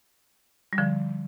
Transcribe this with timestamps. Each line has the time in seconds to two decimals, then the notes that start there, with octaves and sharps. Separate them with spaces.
0.73 G3
0.78 D3 F3